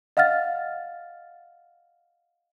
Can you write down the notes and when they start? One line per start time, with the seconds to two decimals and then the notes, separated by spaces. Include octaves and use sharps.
0.17 D#5 F5 F#5 F6 A6